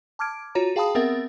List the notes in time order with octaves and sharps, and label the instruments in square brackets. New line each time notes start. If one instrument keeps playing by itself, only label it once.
[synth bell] A5 D6 F6 G#6 D7
F4 F#4 C#5 A#5
G#4 F5 G5 A5 B5 D#6
B3 C4 A#4 E5 F#5 A6